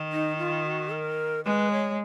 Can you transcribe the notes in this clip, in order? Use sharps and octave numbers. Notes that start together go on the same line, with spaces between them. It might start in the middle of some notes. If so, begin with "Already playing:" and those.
Already playing: D#3
D#4
F4
F#4
A#4
G#3 B4
C#5